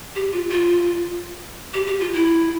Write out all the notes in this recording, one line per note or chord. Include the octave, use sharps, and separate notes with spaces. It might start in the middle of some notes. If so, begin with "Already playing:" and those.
G4
F4
F4
G4
G4
F4
E4